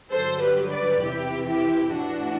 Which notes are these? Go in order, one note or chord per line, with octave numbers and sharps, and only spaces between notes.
G2 D3 F#3 A4 C5
G4 B4
B4 D5
E2 C3 E3 E4 G4
E4 G4
A2 E3 D4 F#4